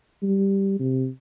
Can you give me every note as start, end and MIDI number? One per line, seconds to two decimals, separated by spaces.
0.23 0.77 55
0.79 1.08 48